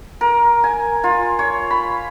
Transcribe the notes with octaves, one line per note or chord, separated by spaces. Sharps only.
A#4
G#5
F4
C#5
B5